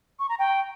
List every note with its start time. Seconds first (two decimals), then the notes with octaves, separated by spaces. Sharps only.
0.19 C#6
0.29 A#5
0.39 G5